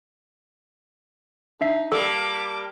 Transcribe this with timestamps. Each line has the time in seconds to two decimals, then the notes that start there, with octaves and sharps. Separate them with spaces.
1.61 D4 D#4 E5 C7
1.92 G3 A#3 A4 A5 D6